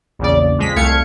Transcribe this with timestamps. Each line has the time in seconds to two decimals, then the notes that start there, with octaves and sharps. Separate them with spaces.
0.19 A#1 E2 C#3 D5
0.58 F2 G#3 B6
0.76 C2 A3 F5 G#6 C#7